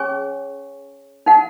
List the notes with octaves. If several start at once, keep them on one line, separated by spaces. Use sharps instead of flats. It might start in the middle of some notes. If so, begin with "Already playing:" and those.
Already playing: C#4 G#4 C#5 G#5 C#6
D#4 A#4 F#5